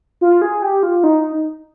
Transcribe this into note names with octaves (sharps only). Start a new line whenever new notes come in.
F4
G#4
G4
F4
D#4